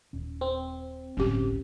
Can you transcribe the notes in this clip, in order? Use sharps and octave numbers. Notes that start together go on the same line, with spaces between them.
D#1 C#4
C4
G1 C#2 A2 D3 F#3 C#4 G4